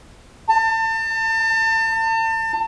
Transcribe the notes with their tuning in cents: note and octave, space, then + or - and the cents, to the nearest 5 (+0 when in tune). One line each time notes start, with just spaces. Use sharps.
A5 +35